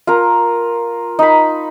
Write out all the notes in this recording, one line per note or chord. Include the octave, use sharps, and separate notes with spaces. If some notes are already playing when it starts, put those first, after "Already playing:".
F4 A#4
D#4 B5